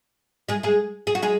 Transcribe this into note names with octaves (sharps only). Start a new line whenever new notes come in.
G#3 G#4
G#3 G#4
G#4
F#4
G#3 G#4